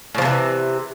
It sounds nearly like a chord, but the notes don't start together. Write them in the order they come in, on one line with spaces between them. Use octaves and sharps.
A2 F3 C3 E3